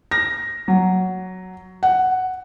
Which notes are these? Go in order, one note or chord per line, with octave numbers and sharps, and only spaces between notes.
A#6
F#3
F#5